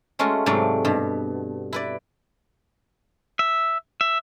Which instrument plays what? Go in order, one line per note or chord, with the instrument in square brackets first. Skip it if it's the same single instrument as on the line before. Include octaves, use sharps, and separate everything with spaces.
[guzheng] G#3 A3 C#4 F4 F#4
G#2 C3 F#3 A3 D5 F5
G2 B2
E4 B4 D5
[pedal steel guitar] E5
E5